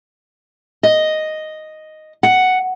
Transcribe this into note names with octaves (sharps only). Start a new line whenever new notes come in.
D#5
F#5